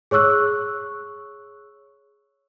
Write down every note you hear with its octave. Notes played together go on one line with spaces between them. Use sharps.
G#4 C#5 C#6 E6 F#6